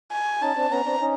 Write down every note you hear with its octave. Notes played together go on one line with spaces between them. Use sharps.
G#5
C#4 D#4 A5
C4 D4
B3 C#4 A#5
C4 D4
C#4 D#4